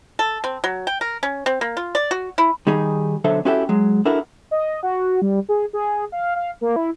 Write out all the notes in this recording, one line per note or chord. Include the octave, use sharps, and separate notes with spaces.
A4
C4
F#3
G5
A#4
C#4
C4
A#3
F4
D5
F#4
E4
D#3 G3 D#4 G#4
B1 D3 F#3 A4 C5 E5
C#4 E4 F#4 G4 A4 E5
F#3 G#3
D4 E4 F#4 A4 A#4
D#5
F#4
G3
G#4
G#4
F5
F5
A#3
E4